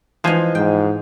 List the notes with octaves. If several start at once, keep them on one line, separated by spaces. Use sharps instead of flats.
E3 F3 G#3 D#4 C5 G#5
G#2 G5